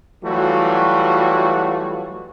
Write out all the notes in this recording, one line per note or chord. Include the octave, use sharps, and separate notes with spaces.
E3 F#3 G3 A3 F4 F#4